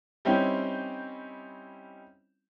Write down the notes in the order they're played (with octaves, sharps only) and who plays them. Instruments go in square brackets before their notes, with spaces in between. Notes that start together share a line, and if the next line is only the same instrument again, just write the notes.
[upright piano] G3 C4 C#4 D#4 E4 G4